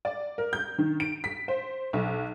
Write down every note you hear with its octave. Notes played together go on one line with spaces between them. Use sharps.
D5
A#4
G6
D#3
D7
B6
C5
B1